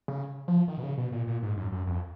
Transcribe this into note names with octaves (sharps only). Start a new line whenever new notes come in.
C#3
F3
D#3
B2
C#3
B2
A#2
A#2
G#2
F#2
F#2
F2